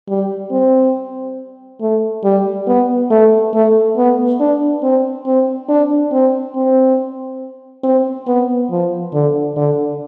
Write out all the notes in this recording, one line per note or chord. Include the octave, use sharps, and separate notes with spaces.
G3
C4
A3
G3
B3
A3
A3
B3
D4
C4
C4
D4
C4
C4
C4
B3
F3
D3
D3